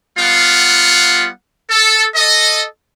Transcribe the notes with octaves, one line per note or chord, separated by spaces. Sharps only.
G3 B3 F4 F5 F#5
A4
A4 D#5